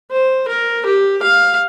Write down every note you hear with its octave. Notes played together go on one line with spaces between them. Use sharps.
C5
A#4
G4
F5